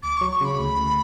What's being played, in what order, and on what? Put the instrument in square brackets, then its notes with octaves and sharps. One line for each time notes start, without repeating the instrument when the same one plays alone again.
[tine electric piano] D2 [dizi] D6
[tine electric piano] F#3 [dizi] C#6
[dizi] C#6
[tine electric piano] C#3 [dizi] B5
[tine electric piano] D2
D2